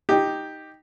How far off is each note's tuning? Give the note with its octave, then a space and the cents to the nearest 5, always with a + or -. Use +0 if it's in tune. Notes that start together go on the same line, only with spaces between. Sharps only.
D#4 +0 G4 +0